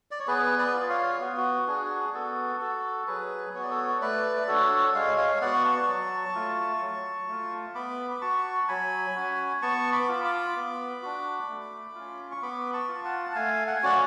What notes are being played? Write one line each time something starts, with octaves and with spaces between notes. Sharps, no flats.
D5
C#5
B3 G#4 B4
B4 D5
F4
C#5 F5
B3 F#4
F#4
D4 F#4 G#4
B3 F#4 A4
F#4 A4
F#3 G#4 B4
B3 F#4 C#5 D5
A4 C#5
A3 B4 D5
D5
D4 F#4 A4 C#5
G#3 C#5 F5
C#5 F5
B3 F#4 D5 F#5
A5 C#6
F#3
A3 F4
F#3
A3 F4
B3 B5 D6
B5
F#4 A5 C#6
F#3 G#5 B5
C#4 F#4
B3 A5 C#6
B5 D6
F4
B5 D6
B3
D4 F#4
A3
C#4 F4
C#6
B3 B5 D6
A5 C#6
F4
F#5 A5
A5
A3 F5 G#5
F#5
G#5
C#4 F#4 D5 F#5